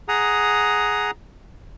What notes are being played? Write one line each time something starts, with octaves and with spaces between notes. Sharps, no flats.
G#4 F#5 A#5 D#6